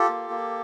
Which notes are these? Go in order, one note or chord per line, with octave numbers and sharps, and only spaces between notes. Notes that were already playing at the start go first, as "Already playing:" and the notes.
Already playing: F4 G4 A4
A#3
A#3